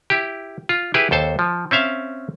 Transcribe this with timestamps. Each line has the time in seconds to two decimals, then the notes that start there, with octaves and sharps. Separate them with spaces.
0.10 E4 G4
0.69 F4
0.94 E4 G4 G#4 B4
1.11 D#2 A4 C5 A5
1.39 F3
1.71 C4 C#4 E5 F5